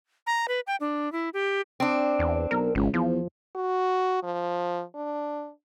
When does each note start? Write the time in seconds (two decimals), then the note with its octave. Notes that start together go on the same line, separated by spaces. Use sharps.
0.27 A#5
0.48 B4
0.67 G5
0.80 D4
1.12 E4
1.34 G4
1.80 C4 D4
2.19 E2
2.51 B1 A#4
2.75 G#1 C#2
2.94 E2 F3
3.55 F#4
4.23 F3
4.95 D4